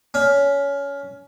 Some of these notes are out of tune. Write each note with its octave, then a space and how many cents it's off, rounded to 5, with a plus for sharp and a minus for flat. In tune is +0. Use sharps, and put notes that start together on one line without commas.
C#4 +20